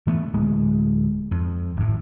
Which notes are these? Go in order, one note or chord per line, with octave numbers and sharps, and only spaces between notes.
E3 A3 B3
D1 G#3
F2
G#1 A2